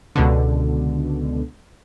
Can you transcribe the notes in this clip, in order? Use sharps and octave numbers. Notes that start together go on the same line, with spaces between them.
C#2 B2 D3